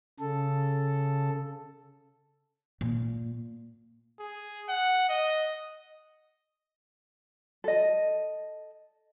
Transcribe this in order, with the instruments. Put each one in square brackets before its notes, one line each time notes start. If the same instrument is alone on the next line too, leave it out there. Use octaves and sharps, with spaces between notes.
[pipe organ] C#3 A4
[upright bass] A#2
[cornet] G#4
F#5
D#5
[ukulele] A4 D#5